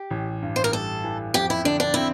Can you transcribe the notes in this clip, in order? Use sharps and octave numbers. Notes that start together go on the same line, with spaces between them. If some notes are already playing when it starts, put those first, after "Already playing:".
Already playing: G4
A1
G2
C5
A#4
G3 A4
E3
F2 G4
E4
D3 D4
D4
C4 E4